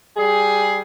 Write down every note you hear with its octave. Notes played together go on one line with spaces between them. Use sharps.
G3 G#4